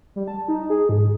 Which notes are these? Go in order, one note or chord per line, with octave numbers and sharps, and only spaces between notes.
G3
A5
D#4
G#4
G#2